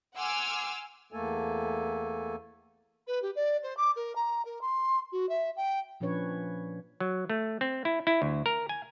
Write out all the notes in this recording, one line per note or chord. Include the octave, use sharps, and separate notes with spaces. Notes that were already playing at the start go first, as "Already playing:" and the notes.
F#5 G#5 C6 D6 E6 F6
E2 A3 A#3 A4 G#5
B4
G4
D5
C5
D6
A#4
A#5
A#4
C6
F#4
E5
G5
A#2 F3 C#4 D4 B4 C#5
F#3
A3
C4
E4
E4
D2
A#4
G#5